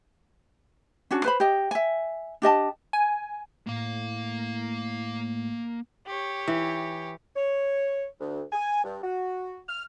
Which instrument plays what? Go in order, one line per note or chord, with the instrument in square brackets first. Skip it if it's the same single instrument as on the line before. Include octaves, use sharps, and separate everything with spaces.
[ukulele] C#4 D4 F#4
B4 C5 B5
G4 D#5
E5 G#5
D4 G4 D#5 A5
[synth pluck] G#5
[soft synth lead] A2 [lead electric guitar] A#3 F5
[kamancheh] G4 C#5
[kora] E3
[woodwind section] C#5
D2
G#5
G2
F#4
F6